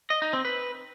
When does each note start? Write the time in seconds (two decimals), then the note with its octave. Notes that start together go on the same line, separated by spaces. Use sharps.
0.10 D#5
0.22 D#4
0.33 C4
0.45 B4